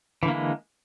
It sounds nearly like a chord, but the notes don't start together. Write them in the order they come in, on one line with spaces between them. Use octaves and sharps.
E3 D3 A#3 E4 G#3